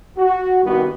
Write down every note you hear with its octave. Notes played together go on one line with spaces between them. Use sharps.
F#4
C2 G2 D#3 G3 B3 F#4